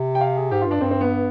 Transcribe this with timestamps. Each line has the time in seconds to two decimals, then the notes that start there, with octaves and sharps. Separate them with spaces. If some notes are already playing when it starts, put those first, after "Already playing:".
Already playing: C3
0.15 G5
0.21 F5
0.37 G#4
0.51 G#2 G4
0.61 F4
0.66 G2 D4
0.81 G2 C4
0.91 C4
1.01 B3